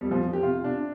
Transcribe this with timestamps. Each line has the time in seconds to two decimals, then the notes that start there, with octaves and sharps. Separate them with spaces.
0.01 F2 G3
0.11 F3
0.22 F2
0.33 G4
0.43 C3 F4
0.64 C3 D4